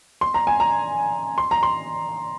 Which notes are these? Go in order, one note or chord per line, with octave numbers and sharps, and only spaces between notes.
C6
A#5
G#5
A#5
C6
A#5
C6